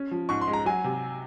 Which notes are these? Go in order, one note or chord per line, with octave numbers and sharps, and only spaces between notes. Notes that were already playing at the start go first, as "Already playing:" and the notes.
Already playing: C#4
F3
G#2 C#6
C6
G#3
A#5
F#3 G#5
C3